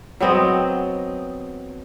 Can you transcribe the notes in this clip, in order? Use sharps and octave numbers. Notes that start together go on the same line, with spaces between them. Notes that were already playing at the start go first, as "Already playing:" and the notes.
F#3 B3 C4 D#5